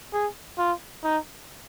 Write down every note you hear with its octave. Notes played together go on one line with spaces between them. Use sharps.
G#4
F4
D#4